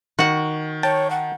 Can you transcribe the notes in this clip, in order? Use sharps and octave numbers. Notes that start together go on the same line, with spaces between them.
D#3 F#4 F#5
C#5 G5 A5
F#5